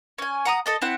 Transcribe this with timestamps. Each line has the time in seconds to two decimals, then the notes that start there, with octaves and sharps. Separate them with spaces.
0.18 C#4 G#5
0.45 F#5 A#5 D#6
0.66 A4 D#5 A5
0.82 C4 E4 F#5